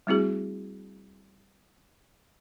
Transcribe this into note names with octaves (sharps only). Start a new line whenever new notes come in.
G3 A3 C4 E4 F#4 G#4